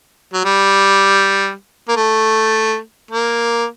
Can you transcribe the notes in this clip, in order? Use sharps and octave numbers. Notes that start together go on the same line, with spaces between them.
F#3
G3
A#3
A3
A#3